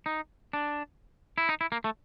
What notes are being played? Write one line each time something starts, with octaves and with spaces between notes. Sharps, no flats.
D#4
D4
E4
D#4
E4
A#3
A3